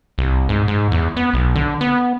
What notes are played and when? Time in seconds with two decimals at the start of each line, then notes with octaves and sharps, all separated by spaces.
0.18 C2
0.49 G#2
0.68 G#2
0.92 E2
1.17 B3
1.34 B1
1.55 D3
1.81 B3